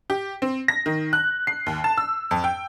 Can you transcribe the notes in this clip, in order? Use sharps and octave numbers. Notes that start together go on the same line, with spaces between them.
G4
C4
A#6
D#3
F#6
C7
D#2
A5
E6
F2
G5